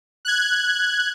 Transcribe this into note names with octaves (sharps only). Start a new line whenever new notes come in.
F#6 G#6